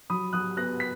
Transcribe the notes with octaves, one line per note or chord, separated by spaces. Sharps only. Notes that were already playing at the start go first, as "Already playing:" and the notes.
F#3 B5 D#6
F#3 D#6 F#6
B3 F#6 A#6
B6